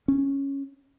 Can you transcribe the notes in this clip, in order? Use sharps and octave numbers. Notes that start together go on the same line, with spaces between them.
C#4